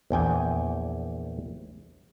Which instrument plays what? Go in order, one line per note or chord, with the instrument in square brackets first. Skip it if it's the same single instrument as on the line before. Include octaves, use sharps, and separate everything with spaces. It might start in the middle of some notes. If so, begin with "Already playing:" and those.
[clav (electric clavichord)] A#1 E2 G5 G#5